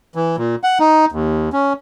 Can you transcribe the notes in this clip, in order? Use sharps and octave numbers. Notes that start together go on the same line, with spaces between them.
E3
A#2
F#5
D#4
D#2
C#4